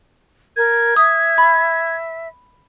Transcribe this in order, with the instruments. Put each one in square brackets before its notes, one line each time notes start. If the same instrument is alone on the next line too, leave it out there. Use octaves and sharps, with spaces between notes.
[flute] A#4 [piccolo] G#6
[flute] E5 [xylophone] D#6
[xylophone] B5